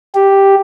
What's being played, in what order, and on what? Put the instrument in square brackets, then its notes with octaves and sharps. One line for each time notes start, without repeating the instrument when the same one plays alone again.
[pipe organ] G4